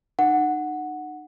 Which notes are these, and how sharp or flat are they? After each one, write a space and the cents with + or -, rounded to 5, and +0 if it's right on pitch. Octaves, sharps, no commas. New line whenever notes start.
D#4 -35 F#5 +0